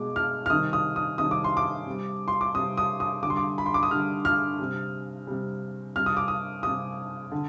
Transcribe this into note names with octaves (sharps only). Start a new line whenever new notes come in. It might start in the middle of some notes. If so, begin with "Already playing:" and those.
Already playing: B2 G#3 D6
F6
F6
C3 D#3 G3 D#6
D#6
D#6
C3 D#3 G3 D#6
D6
C6
D6
C3 G3
C6
D6
C3 G3 D#6
D#6
D#6
D3 G3 C6 D6
D6
B5
C6
D6
D#6
D3 G3 F6
F6
C3 G3
C3 G3
C3 G3 F6
D#6
D6
D#6
C3 G3 D#6
D3